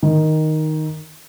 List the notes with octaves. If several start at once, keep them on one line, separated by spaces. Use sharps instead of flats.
D#3